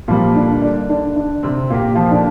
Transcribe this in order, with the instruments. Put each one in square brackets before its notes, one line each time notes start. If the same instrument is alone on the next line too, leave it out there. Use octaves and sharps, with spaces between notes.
[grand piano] A#2 G3 A#3 [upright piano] F3 F4
[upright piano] D3 D4
D3 D4
D3 D4
D3 D4
C3 C4
[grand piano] A#2 A#3 G4 [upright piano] F4
[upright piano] F3 F4
D3 D4